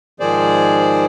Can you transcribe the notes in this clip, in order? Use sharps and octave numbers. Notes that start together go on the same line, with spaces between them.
G#2 D#3 F3 G#4 C5 D5